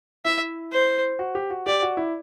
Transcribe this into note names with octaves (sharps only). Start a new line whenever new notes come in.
E4 E5
C5
F#4
G4
F#4
G4 D5
F#4
E4